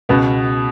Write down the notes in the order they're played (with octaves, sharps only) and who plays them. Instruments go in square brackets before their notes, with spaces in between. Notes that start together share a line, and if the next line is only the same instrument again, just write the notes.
[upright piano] C#2 [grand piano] B2 B3